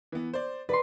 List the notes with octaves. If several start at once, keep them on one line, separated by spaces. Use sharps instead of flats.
E3 B3
C5 D5
B4 D5 B5 C6